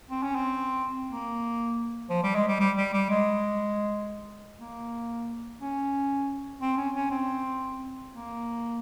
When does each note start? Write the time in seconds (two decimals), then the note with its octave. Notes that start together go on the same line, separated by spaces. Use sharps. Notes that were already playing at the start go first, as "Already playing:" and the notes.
0.10 C4
0.23 C#4
0.36 C4
1.10 A#3
2.10 F3
2.23 G3
2.35 G#3
2.48 G3
2.60 G3
2.77 G3
2.93 G3
3.10 G#3
4.60 A#3
5.61 C#4
6.62 C4
6.77 C#4
6.95 C#4
7.11 C4
8.11 A#3